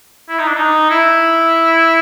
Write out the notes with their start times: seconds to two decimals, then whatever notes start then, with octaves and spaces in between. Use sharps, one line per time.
0.29 E4
0.39 D#4
0.47 D4
0.57 D#4
0.90 E4